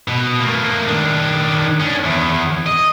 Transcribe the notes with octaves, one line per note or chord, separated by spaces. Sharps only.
B2
A3 A#3
D#3 D4
C#4 D4
E2
D#5